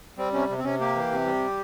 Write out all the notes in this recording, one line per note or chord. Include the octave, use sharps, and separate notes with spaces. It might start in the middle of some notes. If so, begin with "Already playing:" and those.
G3 C4
C3 C#4
C3
C4
C3 C#4
A#3 G4
E3
C3
G3